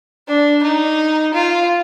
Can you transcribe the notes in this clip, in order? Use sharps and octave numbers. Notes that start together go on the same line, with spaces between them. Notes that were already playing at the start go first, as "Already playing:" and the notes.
D4
D#4
F4